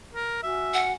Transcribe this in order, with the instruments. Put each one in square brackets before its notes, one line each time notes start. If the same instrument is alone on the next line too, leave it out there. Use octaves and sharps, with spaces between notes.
[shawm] A#4
[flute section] F#4 G#5 F6 [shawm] E5
[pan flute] F#5